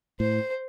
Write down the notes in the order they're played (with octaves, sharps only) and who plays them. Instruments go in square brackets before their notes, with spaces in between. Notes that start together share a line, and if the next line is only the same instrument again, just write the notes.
[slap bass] A2 [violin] C5